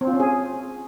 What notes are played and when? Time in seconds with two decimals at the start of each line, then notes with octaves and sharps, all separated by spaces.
0.01 C4
0.07 F4
0.14 C#4
0.20 G#4